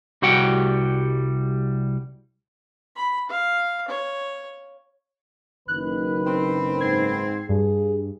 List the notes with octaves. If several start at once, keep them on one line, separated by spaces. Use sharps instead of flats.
C2 G3 F#4 F#5 G5
B5
F5
C#5
F#1 D#3 B4 F#6
C4
G#2 G#6 C7
G2 G#4